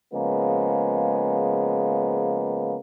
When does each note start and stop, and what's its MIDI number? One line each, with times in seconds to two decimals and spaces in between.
0.13 2.76 49
0.13 2.76 53
0.13 2.76 56
0.13 2.76 58
0.13 2.76 59